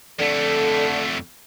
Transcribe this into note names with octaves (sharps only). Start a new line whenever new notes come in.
F2 D3 A3